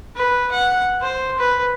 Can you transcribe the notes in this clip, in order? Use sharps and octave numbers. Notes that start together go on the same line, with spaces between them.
B4
F#5
C5
B4